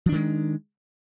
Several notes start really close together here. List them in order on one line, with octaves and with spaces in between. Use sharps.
F3 D4 D#3 G#3